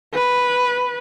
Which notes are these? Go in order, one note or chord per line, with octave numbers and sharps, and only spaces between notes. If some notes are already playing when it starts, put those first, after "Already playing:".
B4